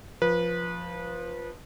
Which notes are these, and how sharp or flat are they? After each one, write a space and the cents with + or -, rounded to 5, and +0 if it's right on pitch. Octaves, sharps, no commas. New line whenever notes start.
F3 +0 B4 -25